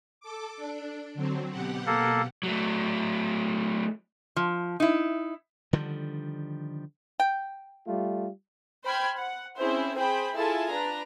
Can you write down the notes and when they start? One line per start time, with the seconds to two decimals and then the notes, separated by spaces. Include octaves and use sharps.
0.20 A4 D6
0.57 D4
1.14 D3 F#3 C4
1.51 B2 G4 F#5
1.87 A#3 A4
2.43 F#3 A3
4.36 F3
4.80 D#4 E4
5.73 D3 D#3 F3 G3
7.20 G5
7.85 G3 A3 F4
8.84 C5 G5 B5 F6 G#6
9.16 F#5
9.57 C4 C#4 E4 G#4 C5
9.95 G#4 C5 G5 B5
10.34 E4 F4 G#4 A4 G#5 A5
10.70 D4 B4 A#5